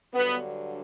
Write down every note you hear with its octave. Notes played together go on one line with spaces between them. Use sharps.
G2 D3 F#3 B3